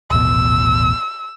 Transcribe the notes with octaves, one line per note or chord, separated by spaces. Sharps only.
D#1 A1 B2 E6